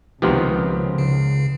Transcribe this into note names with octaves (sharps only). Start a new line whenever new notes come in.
C#2 C3 D#3 F3 B3 G4
C#3